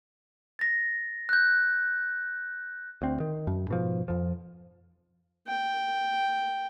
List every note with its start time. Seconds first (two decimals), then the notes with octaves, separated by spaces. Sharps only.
0.59 A6 A#6
1.29 F#6 G6
3.02 D2 C4
3.20 D#3
3.47 F#2
3.68 G#2 B2 F3
4.08 F2 F3
5.47 G5